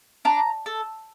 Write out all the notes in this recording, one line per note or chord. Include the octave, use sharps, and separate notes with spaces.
D4 A#5
A4